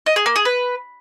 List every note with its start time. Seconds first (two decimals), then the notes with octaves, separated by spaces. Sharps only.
0.06 D#5
0.16 G#4
0.26 A#3
0.36 G#4
0.45 B4